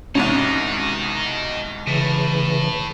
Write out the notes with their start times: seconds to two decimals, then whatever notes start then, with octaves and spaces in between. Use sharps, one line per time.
0.15 C2 G#2 B2 D#3 C#4 D#4
1.87 A2 C#3 E3